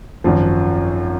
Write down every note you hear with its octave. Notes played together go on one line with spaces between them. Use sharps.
G#1 F#2 F3